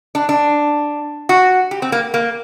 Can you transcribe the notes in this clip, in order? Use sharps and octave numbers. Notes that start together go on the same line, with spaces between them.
D4
D4
F#4
G4
C4
A#3
A#3